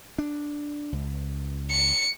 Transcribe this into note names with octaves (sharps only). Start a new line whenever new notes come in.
D4
C#2
C#7